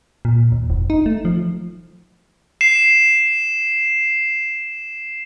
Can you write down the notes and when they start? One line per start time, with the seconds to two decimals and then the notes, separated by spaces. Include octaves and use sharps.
0.25 A#2
0.52 D#2
0.70 F1
0.90 D#4
1.06 A3
1.25 F3
2.61 C7 E7